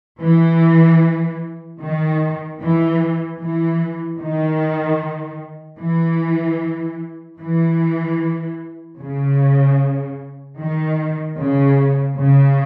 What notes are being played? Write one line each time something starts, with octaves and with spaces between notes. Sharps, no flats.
E3
D#3
E3
E3
D#3
E3
E3
C#3
D#3
C#3
C#3